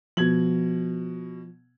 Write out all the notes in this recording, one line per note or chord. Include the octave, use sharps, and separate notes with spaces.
B2 F3 G#6 F#7